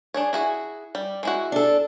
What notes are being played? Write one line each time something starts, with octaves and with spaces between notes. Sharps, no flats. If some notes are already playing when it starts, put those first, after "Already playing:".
D4 G#4 C#5
E4 F#4 G#4
G3
G#3 E4 F#4
D4 A4